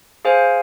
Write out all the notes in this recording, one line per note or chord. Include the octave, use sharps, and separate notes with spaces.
G#4 C5 F5 G#5